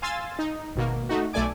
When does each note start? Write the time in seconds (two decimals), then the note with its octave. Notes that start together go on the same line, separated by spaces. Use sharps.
0.02 F5 G#5 C6 E6 A6
0.39 D#4
0.76 G#1 B2 A#3
1.09 A3 D#4 F#4
1.33 B1 A3 A4 D5 G#5 D6